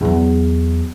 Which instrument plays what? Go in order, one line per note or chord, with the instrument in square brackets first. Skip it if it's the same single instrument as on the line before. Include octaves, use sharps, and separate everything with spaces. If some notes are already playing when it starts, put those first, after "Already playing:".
[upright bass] E2 F#3